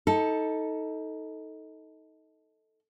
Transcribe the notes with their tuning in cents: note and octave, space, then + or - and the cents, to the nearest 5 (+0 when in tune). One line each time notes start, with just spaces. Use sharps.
D#4 +25 A4 +0